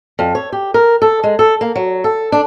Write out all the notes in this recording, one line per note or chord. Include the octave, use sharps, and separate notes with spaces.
F2
C#5
G4
A#4
A4
G#3
A4
A#3
F#3
A4
D4